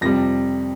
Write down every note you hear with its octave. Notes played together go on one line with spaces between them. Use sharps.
F2 C3 G3 A#6